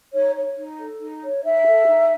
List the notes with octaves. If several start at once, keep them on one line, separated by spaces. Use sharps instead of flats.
D#4 C#5
C#5
D#4
A4
D#4
C#5
D#4 E5
A4
D#4